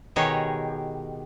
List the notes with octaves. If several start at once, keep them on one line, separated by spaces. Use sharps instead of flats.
B2 D#3 G4 G#4 C#5